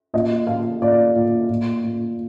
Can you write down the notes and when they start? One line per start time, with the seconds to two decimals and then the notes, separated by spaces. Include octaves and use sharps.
0.14 A#2 D#5
0.47 A#2 F5
0.81 A#2 D5
1.15 A#2
1.49 A#2
1.84 A#2